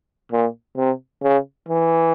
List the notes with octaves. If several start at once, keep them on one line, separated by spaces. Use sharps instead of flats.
A#2
C3
C#3
E3